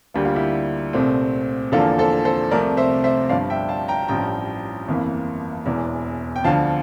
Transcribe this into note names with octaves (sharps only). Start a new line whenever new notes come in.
D2 D3 G3 A#3 G4
F4
E4 G4
C2 A#2 A3 C4
E2 D3 F3 A#3 F4 A4
A4 C5
A4 C5
C2 C3 F3 A3 A#4 D5
C5 E5
C5 E5
G1 G2 F3 D5 F5
E5 G5
F5 A5
G5 A#5
A1 G2 F3 G5 A#5
G1 F2 E3 A#3
E1 E2 E3
G5
D2 D3 F3 F5 A5